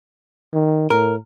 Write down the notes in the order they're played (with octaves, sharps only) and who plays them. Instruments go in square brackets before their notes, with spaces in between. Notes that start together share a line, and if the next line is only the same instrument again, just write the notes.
[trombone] D#3
[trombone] A2 [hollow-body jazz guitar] A#4